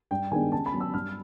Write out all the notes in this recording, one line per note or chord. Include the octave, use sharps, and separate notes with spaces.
G2 G5
D#3 G#3 B3 D4 G#5
C#3 A5
B5
F#3 B3
E6
G2 F6